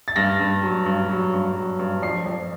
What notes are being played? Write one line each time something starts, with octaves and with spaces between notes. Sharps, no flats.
A6
G2 A#6
G2
F#3
G2
F#3
G2
F#3
G2
F2 C7
F2